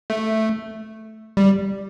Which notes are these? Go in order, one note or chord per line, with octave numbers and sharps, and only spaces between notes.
A3
G3